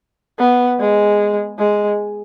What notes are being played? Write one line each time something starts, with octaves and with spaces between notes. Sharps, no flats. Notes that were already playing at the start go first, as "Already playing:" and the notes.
B3
G#3
G#3